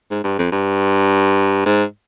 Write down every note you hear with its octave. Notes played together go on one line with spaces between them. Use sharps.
G#2
G2
F2
G2
G#2